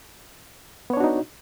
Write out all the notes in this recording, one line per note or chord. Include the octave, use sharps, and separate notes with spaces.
B3 D4 D#4 F#4 C#5